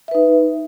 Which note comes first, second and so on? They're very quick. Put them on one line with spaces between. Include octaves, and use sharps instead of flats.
E5 B4 D#4